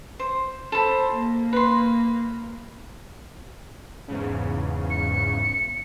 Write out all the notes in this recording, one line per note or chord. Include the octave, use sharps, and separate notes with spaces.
C5
A4 C5 B5
A#3
B4 C6
E2 G#2 C#3
C#7